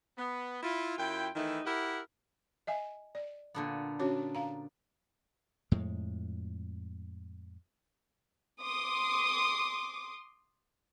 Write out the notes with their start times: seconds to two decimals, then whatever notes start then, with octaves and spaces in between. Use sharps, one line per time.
0.17 B3
0.63 E4 F4
0.98 F#2 E4 F4 G5
1.35 D#3 E3 A3 D#4 E4
1.65 E4 G4 A#4 E5 F#5
2.67 D#5 E5 G#5
3.15 D5
3.55 A#2 D3 B3
3.99 C#4 D4 F#4 C#5
4.35 F5 A#5
5.71 F2 A2 G#3
8.62 C6 D6 D#6